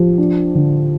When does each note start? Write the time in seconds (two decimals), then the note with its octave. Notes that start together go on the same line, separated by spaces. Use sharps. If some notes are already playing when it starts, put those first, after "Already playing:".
Already playing: F3 G4
0.18 D4
0.55 D3